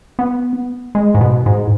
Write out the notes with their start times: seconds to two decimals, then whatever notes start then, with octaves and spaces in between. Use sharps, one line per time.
0.19 B3
0.95 G#3
1.15 G#2
1.21 B2
1.46 G#2